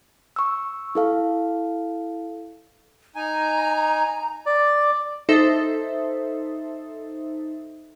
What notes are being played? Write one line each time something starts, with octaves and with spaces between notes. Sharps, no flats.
C#6 E6
E4 A4 F5
D#4 G#5 A#5
D5
D#4 A4 C5 E5